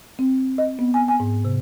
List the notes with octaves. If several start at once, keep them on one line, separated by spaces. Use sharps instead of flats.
C4
D#5
B3
G#5
G#5
G#2
C3